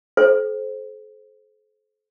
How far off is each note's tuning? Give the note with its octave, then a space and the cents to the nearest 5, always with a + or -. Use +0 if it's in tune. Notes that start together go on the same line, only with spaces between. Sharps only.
A4 -40 C5 +0